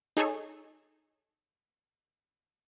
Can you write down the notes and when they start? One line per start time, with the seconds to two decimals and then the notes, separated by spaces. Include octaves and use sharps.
0.17 D#4 G#4 A4 C#5